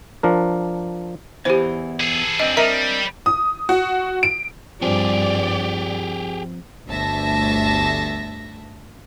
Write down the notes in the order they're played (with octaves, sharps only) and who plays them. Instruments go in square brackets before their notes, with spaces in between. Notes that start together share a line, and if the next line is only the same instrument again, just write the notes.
[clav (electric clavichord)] F3 D4 A#4
[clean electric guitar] E2 [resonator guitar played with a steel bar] E3 [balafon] G4 C5
[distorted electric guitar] G#4 A4
[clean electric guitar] C4 D4 [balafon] D#5
[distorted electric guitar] G3 [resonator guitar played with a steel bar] A#4 D#5 [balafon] E5 A#5
[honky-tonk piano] D#6
F#4
D7
[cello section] G2 D5 [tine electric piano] F3 C4 [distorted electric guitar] G4 G#4
[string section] G1 D2 E5 A5 A#6